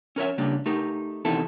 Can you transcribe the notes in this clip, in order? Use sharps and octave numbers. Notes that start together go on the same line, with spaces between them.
C#4 A#4 C#5 E5
C#3 G3 A#3 D4
A3 D#4 G4 A#4
E2 C3 D#3 E4 A4